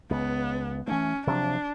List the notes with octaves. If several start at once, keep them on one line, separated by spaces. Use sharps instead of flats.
C#2 B3
E3 A3 C#4
C3 F3 F#3 D4